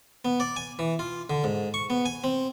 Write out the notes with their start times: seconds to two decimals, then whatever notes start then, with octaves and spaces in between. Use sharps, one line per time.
0.25 B3
0.40 D5
0.56 G#5
0.79 E3
0.99 F4
1.30 D3
1.44 G#2
1.74 C#6
1.90 B3
2.06 G#5
2.24 C4